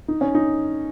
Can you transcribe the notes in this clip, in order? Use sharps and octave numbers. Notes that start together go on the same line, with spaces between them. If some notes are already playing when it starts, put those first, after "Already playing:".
D#4
C#4
D#4